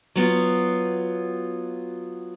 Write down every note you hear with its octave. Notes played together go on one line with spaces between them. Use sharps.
F#3 B3 F4